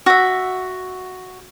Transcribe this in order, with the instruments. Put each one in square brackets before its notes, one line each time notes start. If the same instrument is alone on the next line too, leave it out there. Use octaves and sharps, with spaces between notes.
[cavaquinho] F#4 E5